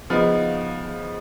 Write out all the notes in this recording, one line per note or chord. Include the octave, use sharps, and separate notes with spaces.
C#3 F3 B3 D#4